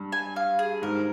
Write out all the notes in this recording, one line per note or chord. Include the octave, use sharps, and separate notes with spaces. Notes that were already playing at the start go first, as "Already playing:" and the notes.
Already playing: G2
G#5
F5
G#4
G#2 A#4